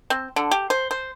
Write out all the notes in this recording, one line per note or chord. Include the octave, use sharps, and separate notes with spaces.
C4
D3
G4
C5
C5